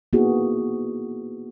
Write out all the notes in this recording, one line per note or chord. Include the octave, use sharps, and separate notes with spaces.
A#3 B3 D#4 E4 F#4 G#4